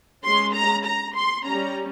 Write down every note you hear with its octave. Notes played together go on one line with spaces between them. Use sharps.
G#3 C#4 C6
A#5
A#5
C6
G3 C#4 A#5